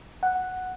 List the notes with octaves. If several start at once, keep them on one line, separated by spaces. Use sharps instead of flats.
F#5